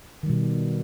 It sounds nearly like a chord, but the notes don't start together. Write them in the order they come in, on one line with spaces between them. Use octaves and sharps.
D#3 G3 B2